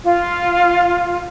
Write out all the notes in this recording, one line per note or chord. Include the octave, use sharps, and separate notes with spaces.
F4